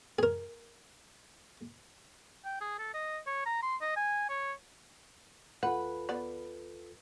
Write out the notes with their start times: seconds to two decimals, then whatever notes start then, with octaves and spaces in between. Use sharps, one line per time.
0.19 G#4 A#4
2.45 G5
2.61 G#4
2.79 A4
2.94 D#5
3.26 C#5
3.46 A#5
3.62 C6
3.81 D#5
3.96 G#5
4.29 C#5
5.63 D#2 F4 A4 B4 F#5
6.09 B3 D5